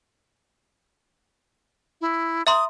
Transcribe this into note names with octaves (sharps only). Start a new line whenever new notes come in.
E4
E5 A#5 C6 D#6